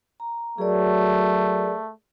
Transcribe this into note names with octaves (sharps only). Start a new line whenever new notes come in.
A#5
F#3 A3 G#4 A#4 D5